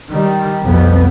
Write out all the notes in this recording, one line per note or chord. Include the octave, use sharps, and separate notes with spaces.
D#3 G3
B1 F2 G3 B3